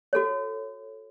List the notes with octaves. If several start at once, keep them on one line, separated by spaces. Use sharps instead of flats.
F#4 A4 C#5